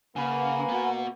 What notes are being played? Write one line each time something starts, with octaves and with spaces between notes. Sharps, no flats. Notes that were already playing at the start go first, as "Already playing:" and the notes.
C#3 A#3 B4 F#5 G#5 B5
B3 F#4